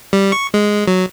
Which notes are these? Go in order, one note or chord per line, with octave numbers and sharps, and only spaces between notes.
G3
C#6
G#3
F#3